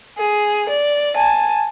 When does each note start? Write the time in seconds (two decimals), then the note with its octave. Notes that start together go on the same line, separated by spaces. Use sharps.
0.18 G#4
0.69 D5
1.16 G#5 A5